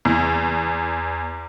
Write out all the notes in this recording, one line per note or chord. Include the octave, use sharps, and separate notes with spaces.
E2